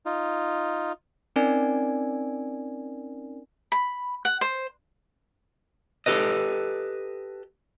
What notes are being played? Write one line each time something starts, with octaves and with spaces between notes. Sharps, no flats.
D#4 F4
C4 C#4 D#4 A#4 D5 G#5
B5
F#5
C5
G4 A4 B4 D#5